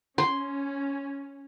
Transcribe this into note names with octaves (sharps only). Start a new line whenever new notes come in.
C#4 C6